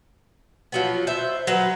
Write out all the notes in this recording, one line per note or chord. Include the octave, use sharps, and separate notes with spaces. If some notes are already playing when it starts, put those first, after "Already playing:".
F3 F#3 B3
C5 E5
F#3 B4